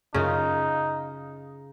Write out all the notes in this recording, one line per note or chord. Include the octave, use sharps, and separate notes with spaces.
F#2 C#3 C#4 D#4 F4